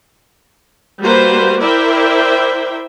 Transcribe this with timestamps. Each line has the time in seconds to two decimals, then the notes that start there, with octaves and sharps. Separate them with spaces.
1.02 G3 A#3 F#4 B4 C5
1.62 E4 A#4 C5 D5 E5 G5